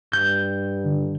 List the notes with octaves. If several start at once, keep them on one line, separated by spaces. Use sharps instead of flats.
G2 G6
D3